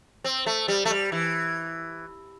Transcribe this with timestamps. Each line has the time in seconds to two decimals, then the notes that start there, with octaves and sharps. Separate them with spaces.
0.24 C4
0.46 A3
0.68 G3
0.85 A3
0.90 G3
1.12 E3